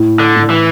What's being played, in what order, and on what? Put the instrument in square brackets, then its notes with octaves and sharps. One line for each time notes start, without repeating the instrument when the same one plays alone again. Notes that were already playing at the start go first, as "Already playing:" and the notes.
Already playing: [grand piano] A2
[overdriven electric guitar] D3
[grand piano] A2
[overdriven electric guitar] E3